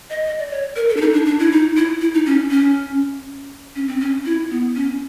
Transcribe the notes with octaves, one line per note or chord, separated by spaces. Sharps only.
D#5
D#5
D5
C#5
A#4
A4
D4
D#4
D4
D4
E4
D#4
E4
E4
D#4
C#4
C#4
C#4
C4
C#4
E4
B3
C#4